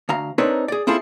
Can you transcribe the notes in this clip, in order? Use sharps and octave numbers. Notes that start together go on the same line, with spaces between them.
D2 F5 A#5
C4 D4 D#4 A#4 B4 C#5
G#4 D5
C4 E4 F4 G#4 A4